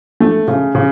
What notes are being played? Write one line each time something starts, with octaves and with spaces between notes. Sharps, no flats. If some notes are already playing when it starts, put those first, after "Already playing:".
A3
C#3
C#3